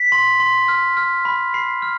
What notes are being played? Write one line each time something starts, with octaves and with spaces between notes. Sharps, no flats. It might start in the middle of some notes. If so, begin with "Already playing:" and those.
Already playing: B6
C6
C6
F6
F6
B5
B5 C7
F6